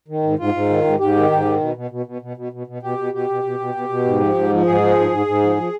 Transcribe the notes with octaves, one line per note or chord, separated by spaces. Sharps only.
D#3
G#2
G#2 F4
G#2
D#3
G#2
G#2 G4
D#3
G#2
D#3
B2
B2
B2
B2
B2
B2
B2
B2
B2 G4
B2
B2 G4
B2
B2
B2
B2
B2
G#2
F3
G#2
F3
G#2 G#4
F3
G#2
G#2
G#2
F3
F3